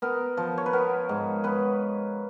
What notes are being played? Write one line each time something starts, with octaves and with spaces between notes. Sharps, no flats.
B3 A#4
F3
C#5
B4
B3 A#4
G#2
B3 B4